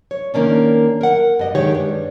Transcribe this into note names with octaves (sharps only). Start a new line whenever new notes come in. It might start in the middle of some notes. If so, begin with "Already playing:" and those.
C#5
D#3 A#3 C#4 D4
A#4 F#5
G2 D#5
D#3 G#3 G4 C#5
G2